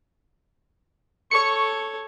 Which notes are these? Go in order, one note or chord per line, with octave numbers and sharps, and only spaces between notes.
A4 C#5 C#6 C#7